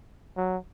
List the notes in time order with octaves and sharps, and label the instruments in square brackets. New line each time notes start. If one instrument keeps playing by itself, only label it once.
[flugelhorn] F#3